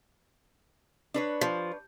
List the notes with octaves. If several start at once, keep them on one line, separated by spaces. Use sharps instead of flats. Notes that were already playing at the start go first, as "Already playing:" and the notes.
D4 B4 C#5
F3